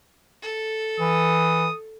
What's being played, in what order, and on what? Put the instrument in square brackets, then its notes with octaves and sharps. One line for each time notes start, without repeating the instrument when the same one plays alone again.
[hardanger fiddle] A4
[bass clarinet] E3 [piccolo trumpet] D#6